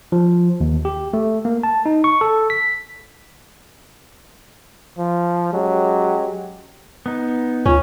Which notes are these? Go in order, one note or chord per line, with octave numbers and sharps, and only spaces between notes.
F3
D#2
G4
A3
A#3
A5
D#4
C#6
A4
B6
F3
F#3 G#3 C#4 G4
B3 D#4
D2 C#4 F4